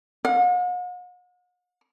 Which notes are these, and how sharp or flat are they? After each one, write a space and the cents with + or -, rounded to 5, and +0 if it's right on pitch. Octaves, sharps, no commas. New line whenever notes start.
F#5 -45